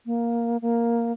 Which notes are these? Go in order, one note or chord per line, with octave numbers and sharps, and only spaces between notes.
A#3
A#3